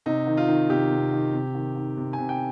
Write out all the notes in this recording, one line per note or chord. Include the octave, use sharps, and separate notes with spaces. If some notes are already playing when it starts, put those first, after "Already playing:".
C3 D#4
D#3
F4
D#3
C3 G4
C3
D#3
C3
D#3
D#3
C3
G#5
C3
G5